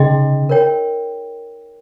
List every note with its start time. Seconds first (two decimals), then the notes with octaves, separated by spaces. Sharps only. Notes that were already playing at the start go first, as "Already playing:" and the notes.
Already playing: C#3 D#4 G#4 D#5 G5 C6
0.49 A#4 C#5 G5